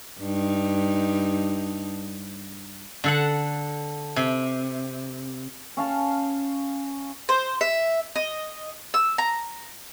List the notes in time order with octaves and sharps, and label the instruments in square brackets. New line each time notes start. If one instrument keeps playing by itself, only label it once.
[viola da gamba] G2 D#4
[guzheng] D3 A4 F#5
C3
[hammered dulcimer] C#4 F5 A5
[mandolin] C5
E5
D#5
E6
A#5